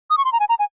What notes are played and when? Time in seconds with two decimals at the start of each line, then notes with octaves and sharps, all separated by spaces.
0.10 D#6
0.18 C#6
0.25 C6
0.33 A#5
0.40 G#5
0.49 A#5
0.59 G#5